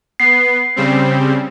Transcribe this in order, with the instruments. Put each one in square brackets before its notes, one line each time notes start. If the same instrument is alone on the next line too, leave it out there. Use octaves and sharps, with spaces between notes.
[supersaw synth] B3 [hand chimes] C7
[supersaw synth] C#3 G3 C4